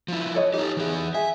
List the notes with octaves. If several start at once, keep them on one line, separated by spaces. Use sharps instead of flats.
F3 E4
A4 C#5 D#5
D#4 G4 A4
E3 G#4
G#4 E5